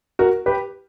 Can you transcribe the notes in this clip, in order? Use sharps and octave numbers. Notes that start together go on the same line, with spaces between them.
F#4 A#4
G4 B4